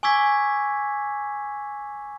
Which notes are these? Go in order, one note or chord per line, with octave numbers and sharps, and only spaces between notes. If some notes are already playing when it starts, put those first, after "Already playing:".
G#5 C#6 D6 E6 G#6 B6